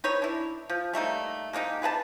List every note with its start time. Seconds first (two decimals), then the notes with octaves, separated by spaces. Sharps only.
0.04 D#4 B4 C#5
0.22 D4 E4
0.70 F3
0.93 G3 A3 A#3 D#4
1.53 G#3 A#3 D#4 G4
1.82 G#4 B4 F#5 A5